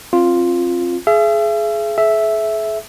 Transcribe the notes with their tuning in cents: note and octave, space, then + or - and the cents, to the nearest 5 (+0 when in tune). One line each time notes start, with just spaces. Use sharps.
C4 +25 F4 +0
G#4 +25 E5 +40
G#4 +45 E5 +0